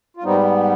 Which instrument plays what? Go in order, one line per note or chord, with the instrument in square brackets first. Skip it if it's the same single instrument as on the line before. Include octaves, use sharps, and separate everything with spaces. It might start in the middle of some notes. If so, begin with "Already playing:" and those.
[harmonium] F4
G#2 G3 B3 C4 D#4